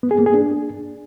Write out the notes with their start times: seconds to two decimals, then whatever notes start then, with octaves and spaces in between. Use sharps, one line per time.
0.03 B3
0.11 G#4
0.19 A#3
0.26 G#4
0.34 D4